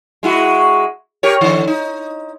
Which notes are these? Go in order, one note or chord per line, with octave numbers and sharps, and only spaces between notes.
G#3 E4 F#4
G4 A#4 C#5
D3 D#3
D#4